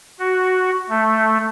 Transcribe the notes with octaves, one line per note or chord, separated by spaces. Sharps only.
F#4
A3